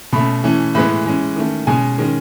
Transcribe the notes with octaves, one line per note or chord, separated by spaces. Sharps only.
B2 A3 C#4 B5
E3 A3 C#4
A2 E3 G#3 B3 B5
E3 G#3 C#4
D#3 A3 C#4
B2 G#3 C#4 G#5
D#3 G#3 C#4